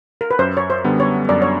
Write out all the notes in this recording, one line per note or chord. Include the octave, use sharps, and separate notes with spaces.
A#4
B4
F#2 C5
C#5
C5
D3 G3 B3
C#5
F#2 D5
C#5